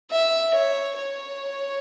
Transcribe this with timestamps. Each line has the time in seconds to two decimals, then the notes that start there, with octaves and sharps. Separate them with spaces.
0.11 E5
0.54 C#5
0.96 C#5